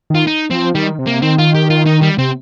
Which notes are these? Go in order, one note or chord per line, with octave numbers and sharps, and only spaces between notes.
D#3 F4
D#4
F3 C4
D#3 G3
C3
A#3
D#3 C4
F4
G4
F4
D#4
G3
C3 C4